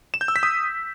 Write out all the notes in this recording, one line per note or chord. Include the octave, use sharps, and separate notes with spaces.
E7
G6
E6
B6
D#6